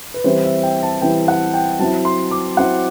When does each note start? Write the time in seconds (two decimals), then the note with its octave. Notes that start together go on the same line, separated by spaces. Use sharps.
0.14 B4
0.24 E3 G3 C4 E4 C5
0.44 E5
0.63 G5
0.83 A5
1.02 E3 G3 C4 E4 G5
1.28 F#5
1.54 G5
1.79 F#3 C4 E4 A5
2.05 C6
2.31 D6
2.57 F#3 C4 E4 F#5